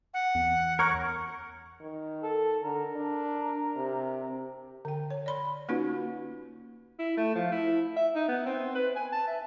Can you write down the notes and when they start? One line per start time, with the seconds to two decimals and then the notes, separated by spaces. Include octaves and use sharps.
0.14 F#5
0.35 E2
0.79 A#4 C#5 A#5 C#6 F#6
1.81 D#3
2.23 A4
2.63 D3 A#4
2.96 D4
3.76 C3
4.85 D3 G5
5.10 C#5
5.26 D5 B5 C6
5.69 A#3 C#4 D#4 F4 F#4 B4
6.99 E4
7.17 A3
7.35 F3
7.52 E4
7.96 E5
8.15 D#4
8.28 B3
8.46 C4
8.75 B4
8.96 G#5
9.12 A5
9.27 E5